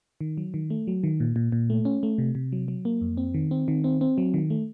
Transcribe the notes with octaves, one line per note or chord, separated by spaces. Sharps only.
D#3
F#3
D#3
A3
F#3
D#3
A#2
A#2
A#2
A3
C#4
A3
C3
C3
F#3
F#3
A#3
F2
C4
D#3
C4
D#3
C4
C4
F#3
D#3
A3